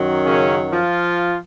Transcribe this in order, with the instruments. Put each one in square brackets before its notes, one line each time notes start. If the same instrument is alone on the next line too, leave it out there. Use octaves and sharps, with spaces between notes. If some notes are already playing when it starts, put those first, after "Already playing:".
Already playing: [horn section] F#2 D#3 F#3
C#3 C#4
F3 F4